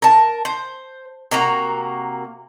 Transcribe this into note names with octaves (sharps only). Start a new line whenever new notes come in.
A#4 A5
C5
C3 A#3 F#4 A#5